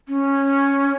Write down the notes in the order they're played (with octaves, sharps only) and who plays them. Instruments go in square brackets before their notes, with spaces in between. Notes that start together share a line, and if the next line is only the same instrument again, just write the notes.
[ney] C#4